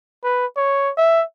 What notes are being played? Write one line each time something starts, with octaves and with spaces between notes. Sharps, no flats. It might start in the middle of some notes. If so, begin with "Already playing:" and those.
B4
C#5
E5